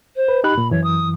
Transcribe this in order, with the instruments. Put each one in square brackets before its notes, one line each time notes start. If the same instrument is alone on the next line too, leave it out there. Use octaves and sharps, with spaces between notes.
[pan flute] C5
[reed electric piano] B4
[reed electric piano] D#4 G4 F#6 [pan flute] B5
[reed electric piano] A#2
[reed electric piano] F#2 E3 [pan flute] C#5
[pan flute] D#6